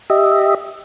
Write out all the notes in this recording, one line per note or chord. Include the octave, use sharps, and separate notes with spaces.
G4 D#5 E5